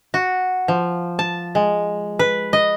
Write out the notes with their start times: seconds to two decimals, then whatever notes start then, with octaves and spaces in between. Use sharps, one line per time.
0.14 F#4
0.68 F3
1.19 A5
1.55 G#3
2.19 B4
2.53 D#5